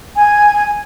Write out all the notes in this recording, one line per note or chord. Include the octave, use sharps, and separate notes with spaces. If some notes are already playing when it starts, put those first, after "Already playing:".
G#5